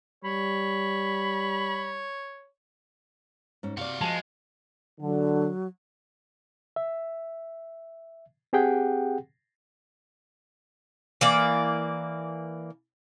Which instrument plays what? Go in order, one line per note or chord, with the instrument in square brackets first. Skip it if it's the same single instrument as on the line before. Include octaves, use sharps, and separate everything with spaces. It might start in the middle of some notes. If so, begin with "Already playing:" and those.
[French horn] G3 [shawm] C#5 [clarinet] B5
[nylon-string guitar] G#2 C#4
[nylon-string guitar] C3 D5 [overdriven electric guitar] F#4 F5
[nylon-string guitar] F3 [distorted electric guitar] G#3 [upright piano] A5
[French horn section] D3 [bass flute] F#3
[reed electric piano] E5
C4 G4 G#4 F#5 G5
[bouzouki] E3 A#3 D5